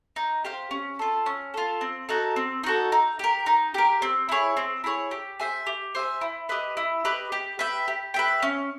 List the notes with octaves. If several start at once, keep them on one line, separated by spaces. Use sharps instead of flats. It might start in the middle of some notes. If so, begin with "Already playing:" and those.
D#4
G4 C5 F5
C#4
F4 A4
C#4
F4 A4
C4
D#4 F#4 A4
C4
D#4 F#4 A4
D#4
G4 A#4
D#4
G4 A#4
C4
E4 G#4 C#5
C4
E4 G#4 C#5
G4
C5 E5 G#5
G4
C5 E5 G#5
E4
G4 B4 D#5
E4
G4 B4 D#5
G4
B4 E5 G5
G4
B4 E5 G5
C#4